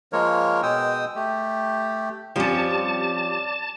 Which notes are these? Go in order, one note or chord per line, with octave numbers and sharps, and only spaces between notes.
F3 G#3 A#3 A#4 C#5
B2 G#3 G5 D#6 E6
A3 G4
F2 F3 G3 C#4 G4 D5 A5